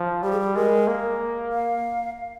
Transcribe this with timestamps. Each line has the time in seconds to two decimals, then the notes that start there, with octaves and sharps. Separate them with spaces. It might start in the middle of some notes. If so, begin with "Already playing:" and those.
Already playing: F3
0.23 G3 G4
0.31 G#4
0.40 G4
0.55 G#3 A#4
0.88 A#3
1.52 F5